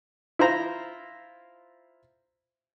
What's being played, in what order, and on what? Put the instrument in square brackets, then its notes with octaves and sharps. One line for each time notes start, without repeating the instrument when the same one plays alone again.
[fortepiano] E4 F4 C5 A#5